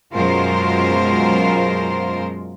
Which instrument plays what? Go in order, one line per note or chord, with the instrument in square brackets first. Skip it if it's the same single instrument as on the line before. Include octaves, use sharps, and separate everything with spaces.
[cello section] F#2 B2 G#3 F4 A#4 C5